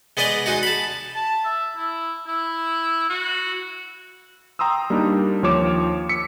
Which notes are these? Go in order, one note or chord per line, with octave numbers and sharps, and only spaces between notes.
G#3 B3 B4 D5 D#5
G#3 D#4 F#4
A5 B5
A5
E5
E4
E4
F#4
G5 A#5 C6 D#6 E6
G3 A#3 D4 D#4
D#2 F3 F4 C#5 D6 E7
E6 B6 C#7